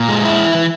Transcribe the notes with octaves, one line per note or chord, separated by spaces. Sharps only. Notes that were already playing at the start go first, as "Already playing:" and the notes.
Already playing: A#2
G#3
E4
E3
E3